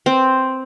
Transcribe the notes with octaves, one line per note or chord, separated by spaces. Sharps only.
C4